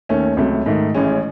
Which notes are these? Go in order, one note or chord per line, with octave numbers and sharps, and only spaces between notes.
D#2 D#3 A3 C#4
C#2 C3 F#3 A3
G#2 D#3 A3
A1 A2 G#3 C#4